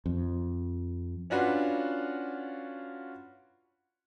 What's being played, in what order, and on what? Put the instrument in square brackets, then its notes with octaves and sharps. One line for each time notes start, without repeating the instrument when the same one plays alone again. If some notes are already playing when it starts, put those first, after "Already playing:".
[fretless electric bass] F2
[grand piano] C#4 D4 F4 F#4 B4 F5